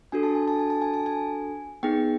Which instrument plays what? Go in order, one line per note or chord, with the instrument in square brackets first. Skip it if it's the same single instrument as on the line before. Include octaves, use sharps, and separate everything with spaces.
[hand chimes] D4 F#4 A4 G#5
A5
G#5
A5
G#5
A5
G#5
A5
G#5
B3 D#4 G#4 G5